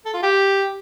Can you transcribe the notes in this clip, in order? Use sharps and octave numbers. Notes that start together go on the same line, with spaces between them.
A4
F4
G4